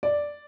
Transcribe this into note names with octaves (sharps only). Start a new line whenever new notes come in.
D5